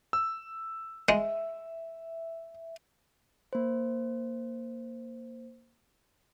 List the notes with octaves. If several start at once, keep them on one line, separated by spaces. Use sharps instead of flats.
E6
G#3 E5
A#3 C5